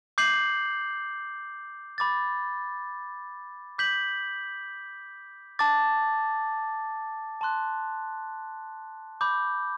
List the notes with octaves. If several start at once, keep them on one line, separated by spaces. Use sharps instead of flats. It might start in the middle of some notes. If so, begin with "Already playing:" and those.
D6 G6 C7 F#7
B5 D6 A6
D6 G6 B6 F#7
A5 D6 A6
A5 C6 F#6
B5 D6 G6